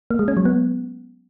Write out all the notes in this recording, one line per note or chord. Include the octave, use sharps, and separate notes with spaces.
A#3
G#3
C#4
F#3
B3